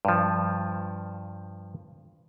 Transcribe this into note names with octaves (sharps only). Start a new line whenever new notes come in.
G2 F3